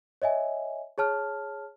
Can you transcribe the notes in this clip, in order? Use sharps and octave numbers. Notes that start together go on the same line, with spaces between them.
C#5 D#5 E5 G#5
G#4 C#5 A5 F6